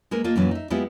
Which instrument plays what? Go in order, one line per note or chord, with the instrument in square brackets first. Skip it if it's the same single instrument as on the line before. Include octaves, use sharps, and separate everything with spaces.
[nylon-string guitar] G#3 A#3 A#4 B4
A#3 F4 A4 D#5
F#2 A#2 E3 F#3
D#4 E5
G#3 B3 E4 F4 G4